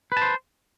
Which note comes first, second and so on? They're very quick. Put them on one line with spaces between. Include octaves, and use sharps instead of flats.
B4 A5 C5